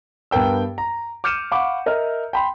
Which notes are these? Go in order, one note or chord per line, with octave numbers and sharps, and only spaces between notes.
G2 B3 A#4 G5 E6
A#5
D6 F6 G6 C#7 D#7 E7
F5 F#5 B5 C#6 D6
A#4 D#5 E5 A#5 F6
G5 B5 C6